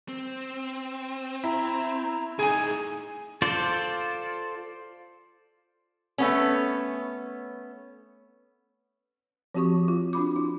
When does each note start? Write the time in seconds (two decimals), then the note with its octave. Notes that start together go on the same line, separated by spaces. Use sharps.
0.09 C4
1.44 E4 A#5
2.39 A2 D#4 G#4 G#5
3.42 F4 A4 C5 D5
6.18 A3 B3 C#4
9.55 F3 C4 F#4 G4 C#6
9.88 F4
10.13 D4 F#4 B5 D6
10.36 E4